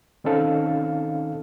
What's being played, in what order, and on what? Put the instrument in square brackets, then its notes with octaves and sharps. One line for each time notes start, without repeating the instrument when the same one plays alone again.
[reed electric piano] D#3 C4 C#4 D#4 A4 F5